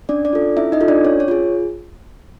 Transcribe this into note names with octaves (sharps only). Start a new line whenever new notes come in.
C#4 D4 D5
D4 D5
F4 A4
C#4 E4 E5
D#4 D#5
F4 A4
D4 D5
C#4 C#5
C#5
F4 G#4